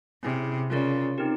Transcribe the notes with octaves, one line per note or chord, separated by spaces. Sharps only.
C3 C#4 E4 G#4
C#3 F4 A#4 D5
C4 D#4 G4 A#4